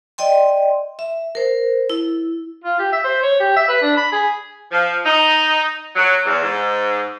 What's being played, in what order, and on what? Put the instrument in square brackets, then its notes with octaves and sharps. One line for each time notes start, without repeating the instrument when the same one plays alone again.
[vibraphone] D5 D#5 G5 C6
E5
A#4 C5
E4 E6
[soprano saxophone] F4
G4
E5
C5
C#5
G4
E5
B4
D4
B5
G#4
[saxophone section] F3
D#4
F#3
E2
G#2